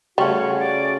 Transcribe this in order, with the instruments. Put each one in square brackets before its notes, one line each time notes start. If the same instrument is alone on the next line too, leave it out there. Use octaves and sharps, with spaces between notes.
[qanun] C#3 A3 [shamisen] G3 [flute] C#4 [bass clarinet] F#4
[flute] D5